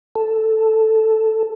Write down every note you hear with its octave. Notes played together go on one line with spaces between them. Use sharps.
A4